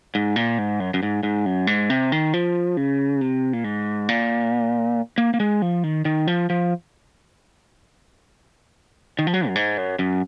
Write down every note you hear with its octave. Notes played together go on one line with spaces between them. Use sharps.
G#2
A#2
G#2
F#2
F#2
G#2
G#2
F#2
G#2
C3
D#3
F3
C#3
C3
A#2
G#2
A#2
A#3
A#3
G#3
F3
D#3
D#3
F3
F3
D#3
F3
F#3
F#2
G#2
F#2
F#2